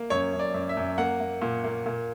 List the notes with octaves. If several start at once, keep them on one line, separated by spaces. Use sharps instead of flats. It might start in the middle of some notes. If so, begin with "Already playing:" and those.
Already playing: A#3
F#2 C#5
F#2
D5
F#2
E5
F#2
A#3 F#5
A#3
A#2
A#3
A#2